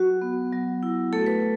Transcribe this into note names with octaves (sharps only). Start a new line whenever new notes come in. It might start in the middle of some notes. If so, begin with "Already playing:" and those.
Already playing: F#3 F#4
B3
F#3
E4
A3 A4
B4